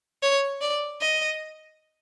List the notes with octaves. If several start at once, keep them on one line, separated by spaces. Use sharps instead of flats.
C#5
D5
D#5